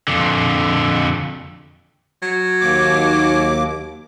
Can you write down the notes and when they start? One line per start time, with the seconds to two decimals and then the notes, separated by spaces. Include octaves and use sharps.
0.08 F2 D3
2.22 F#3
2.61 D#2 D6